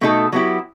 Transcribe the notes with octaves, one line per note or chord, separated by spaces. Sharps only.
B2 A3 D#4 A4
F#3 B3 E4 G4